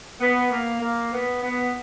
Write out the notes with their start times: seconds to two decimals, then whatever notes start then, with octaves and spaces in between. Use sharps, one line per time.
0.20 B3
0.51 A#3
0.82 A#3
1.13 B3
1.43 B3